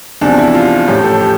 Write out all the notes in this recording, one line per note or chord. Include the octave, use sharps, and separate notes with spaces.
E2 C3 F3 D4
E4
F4
A1 A2 F3 G4
A4
G4